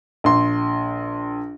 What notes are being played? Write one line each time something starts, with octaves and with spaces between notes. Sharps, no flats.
A#1 C6